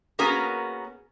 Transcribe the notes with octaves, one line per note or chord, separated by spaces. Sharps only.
A#3 B3 C#4 F#4 G#4 A#4